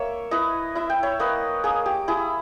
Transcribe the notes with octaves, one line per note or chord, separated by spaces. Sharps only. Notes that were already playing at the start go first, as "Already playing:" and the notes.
Already playing: A#3 C#5 E5
E4 B4 D#5
E4 E5
G5
C#5 E5
A#3 B4 D#5
A#3 G#4
G4
E4 G#4